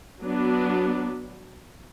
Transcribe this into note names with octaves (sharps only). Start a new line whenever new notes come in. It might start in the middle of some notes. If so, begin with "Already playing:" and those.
F#3 B3 D4